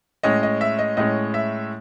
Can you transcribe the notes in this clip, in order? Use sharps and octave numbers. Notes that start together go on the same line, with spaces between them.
A2 G#3 C#4 D#5
D#5
E5
D#5
A2 G#3 C#4 D#5
E5